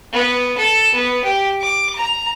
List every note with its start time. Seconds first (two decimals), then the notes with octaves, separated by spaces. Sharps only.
0.12 B3
0.58 A4
0.94 B3
1.24 G4
1.61 D6
1.96 A#5